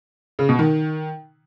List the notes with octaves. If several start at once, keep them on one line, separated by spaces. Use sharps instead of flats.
C#3
B2
D#3